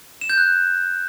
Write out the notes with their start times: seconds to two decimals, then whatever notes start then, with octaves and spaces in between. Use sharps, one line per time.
0.21 E7
0.30 G6
0.38 F#6